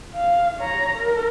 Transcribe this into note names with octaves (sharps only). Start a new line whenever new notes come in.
F5
C#5 A#5
A#4